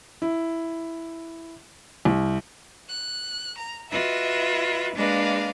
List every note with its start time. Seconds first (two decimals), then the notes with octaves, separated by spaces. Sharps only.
0.22 E4
2.05 C2
2.89 F#6
3.58 A#5
3.90 F4 F#4 B4 D#5 E5
4.95 G#3 A#3 D4 B4 D#5 F5